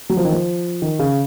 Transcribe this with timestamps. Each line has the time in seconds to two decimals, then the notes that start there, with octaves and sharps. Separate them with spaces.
0.10 F#3
0.17 F3
0.25 D#3
0.32 F3
0.82 D#3
0.99 C#3